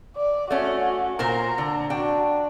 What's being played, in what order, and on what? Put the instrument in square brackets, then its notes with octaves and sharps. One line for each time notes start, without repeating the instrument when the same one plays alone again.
[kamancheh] D5
[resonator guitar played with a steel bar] A3 C#4 [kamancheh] F#4
[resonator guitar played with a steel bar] A#2 A#4 C5 [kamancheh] A#5
[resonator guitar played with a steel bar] D3
[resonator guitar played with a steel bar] D4 G5 [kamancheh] F#4